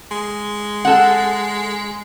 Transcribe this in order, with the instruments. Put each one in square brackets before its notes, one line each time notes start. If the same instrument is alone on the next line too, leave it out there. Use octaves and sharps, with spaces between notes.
[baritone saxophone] G#3
[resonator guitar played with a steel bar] A4 F#5